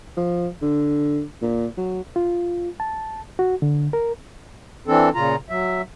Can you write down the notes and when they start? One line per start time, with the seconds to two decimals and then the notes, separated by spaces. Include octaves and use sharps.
0.17 F3
0.62 D3
1.42 A#2
1.78 F#3
2.16 F4
2.80 A5
3.39 F#4
3.62 D3
3.93 A#4
4.88 E3 C4 D4 A4
5.15 A#2 C#3 F4 A#5
5.49 F#3 E5